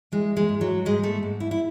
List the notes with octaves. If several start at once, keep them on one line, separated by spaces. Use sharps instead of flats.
E3 G#3
G#3
G#2
F#3
G#2 G#3
A3
G#2
E4
E4